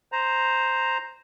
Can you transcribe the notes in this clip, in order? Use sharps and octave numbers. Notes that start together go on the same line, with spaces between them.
C5 A#5